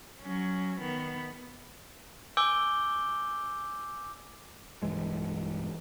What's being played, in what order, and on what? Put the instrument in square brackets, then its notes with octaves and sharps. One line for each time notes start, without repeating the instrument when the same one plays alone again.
[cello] F#3 C#4
D#3 B3
[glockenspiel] G#5 D6 E6 G6 D7 G7
[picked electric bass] B1 G2 E3 G#3